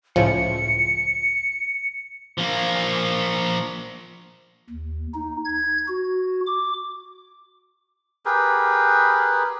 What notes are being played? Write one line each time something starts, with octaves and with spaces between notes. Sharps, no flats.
C#2 A2 F3 C#7
F3 A#3
D#2
D#4
G#6
F#4
D6
G4 G#4 A#4 B4